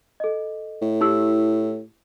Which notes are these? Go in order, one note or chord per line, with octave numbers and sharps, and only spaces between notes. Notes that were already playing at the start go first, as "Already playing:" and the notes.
A4 D#5
A2
E4 G4 E6